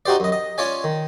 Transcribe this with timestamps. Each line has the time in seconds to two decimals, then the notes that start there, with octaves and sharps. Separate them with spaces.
0.06 D#4 F#4 G4 C5 D5
0.20 F#2 D#5
0.32 D#5
0.58 C#4 F4 C#5 D5 G#5
0.84 D#3